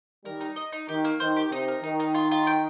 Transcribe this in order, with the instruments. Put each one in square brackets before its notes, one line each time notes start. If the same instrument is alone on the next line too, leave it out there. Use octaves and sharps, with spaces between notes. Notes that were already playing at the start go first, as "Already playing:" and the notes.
[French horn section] D#3 G3 [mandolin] A#4
[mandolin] D#4
D#5
D#4
[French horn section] D#3 [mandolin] G4
[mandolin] A#3
[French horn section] D#3 [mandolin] C5
[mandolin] G4
[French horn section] C3 [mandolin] D#4
[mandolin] A#4
[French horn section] D#3 [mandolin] D#4
[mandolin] D#4
F4
F4
G5